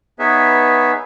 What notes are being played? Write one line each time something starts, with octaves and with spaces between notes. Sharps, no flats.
B3 D#4 G#4 B4 C#5 E5